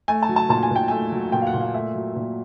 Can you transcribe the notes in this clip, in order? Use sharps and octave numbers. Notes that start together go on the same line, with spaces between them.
A3 G#5
A5
F#3
A5
A#2 A5
G#5
A#2 G5
A3 G#5
F#3
A#2 G5
F5
F#5
A#2
F5
A3 E5
F#3
A#2